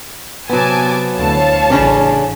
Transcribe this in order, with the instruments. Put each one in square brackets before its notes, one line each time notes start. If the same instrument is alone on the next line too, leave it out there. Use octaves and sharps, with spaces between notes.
[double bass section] C3 [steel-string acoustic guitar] F#3 B3 [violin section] G#5 A5 D6
[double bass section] D2 E3 [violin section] C#5 F5 A5
[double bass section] A1 [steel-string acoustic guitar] C#3 C#4 D4